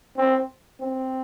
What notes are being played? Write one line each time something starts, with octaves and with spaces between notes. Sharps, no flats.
C4
C4